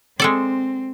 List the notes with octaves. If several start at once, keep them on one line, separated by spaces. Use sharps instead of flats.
G#3 C4 A4 D5